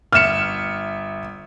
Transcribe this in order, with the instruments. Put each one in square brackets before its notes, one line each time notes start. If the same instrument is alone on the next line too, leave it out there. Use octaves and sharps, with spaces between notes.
[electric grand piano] G1 E5 C#7 [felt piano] F6 E7